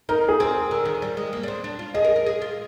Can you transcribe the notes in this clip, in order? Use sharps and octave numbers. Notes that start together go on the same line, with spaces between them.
D#4 A#4
G#4
C4
D3 A#4
D#3
G3
G#3
A#3
D4
C4
D4
F4
G#4 D#5
A#4
A#4
G#4
F4